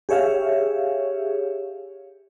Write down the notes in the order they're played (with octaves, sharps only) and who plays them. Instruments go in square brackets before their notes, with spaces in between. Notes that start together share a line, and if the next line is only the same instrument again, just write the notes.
[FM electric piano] G4 G#4 C#5 E5 F5